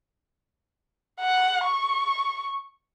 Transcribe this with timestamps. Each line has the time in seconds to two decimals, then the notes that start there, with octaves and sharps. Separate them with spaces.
1.21 F#5
1.65 C#6